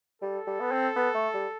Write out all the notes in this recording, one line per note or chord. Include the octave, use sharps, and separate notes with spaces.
G3 A4
G3
B3
C4
B3
A3
G3